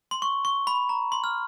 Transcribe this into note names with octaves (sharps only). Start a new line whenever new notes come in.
C6
C#6
C#6
B5
A#5
C6
F6